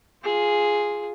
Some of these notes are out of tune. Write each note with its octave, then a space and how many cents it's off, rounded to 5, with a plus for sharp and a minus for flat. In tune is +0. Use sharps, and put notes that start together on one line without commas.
F4 +0 G#4 +0